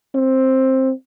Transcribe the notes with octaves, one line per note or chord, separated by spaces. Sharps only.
C4